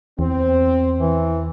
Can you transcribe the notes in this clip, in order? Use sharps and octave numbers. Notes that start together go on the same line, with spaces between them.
E2 C4
E3